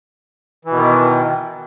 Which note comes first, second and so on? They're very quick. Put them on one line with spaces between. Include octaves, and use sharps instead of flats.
E3 B2 D#3